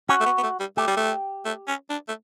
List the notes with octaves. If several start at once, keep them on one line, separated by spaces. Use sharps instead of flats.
C#4 F#4
A3
B3
B3
A3
G3
A3 G4
G3
A3
A3
C#4
D4
A3